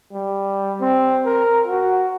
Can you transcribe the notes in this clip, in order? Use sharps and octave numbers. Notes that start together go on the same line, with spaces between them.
G3
C4
A#4
F#4